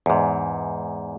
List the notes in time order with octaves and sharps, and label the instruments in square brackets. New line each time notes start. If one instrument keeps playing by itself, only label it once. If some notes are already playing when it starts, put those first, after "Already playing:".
[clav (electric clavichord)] E2 G#2